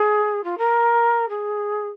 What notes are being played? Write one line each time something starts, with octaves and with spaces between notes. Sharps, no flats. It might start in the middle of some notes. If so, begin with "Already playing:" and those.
Already playing: G#4
F4
A#4
G#4